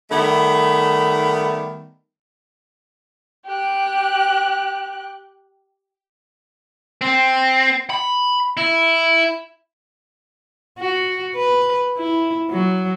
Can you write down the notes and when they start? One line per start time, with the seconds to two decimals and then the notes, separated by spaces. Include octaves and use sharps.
0.09 D#3 G3 A3 B3
3.46 G4 F#6
7.01 C4
7.90 B5
8.57 E4
10.79 F#4
11.36 B4
11.97 E4
12.51 F#3